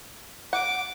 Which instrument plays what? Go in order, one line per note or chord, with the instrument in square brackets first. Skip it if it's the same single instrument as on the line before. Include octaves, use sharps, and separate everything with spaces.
[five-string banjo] F#5 [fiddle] D6